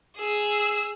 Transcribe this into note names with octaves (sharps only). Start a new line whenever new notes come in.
G#4 E6